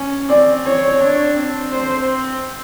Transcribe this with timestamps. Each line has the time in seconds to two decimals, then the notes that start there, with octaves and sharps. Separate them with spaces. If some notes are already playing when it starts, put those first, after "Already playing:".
Already playing: C#4
0.29 C4 D5
0.65 C#5
1.00 D4
1.37 C4
1.72 C5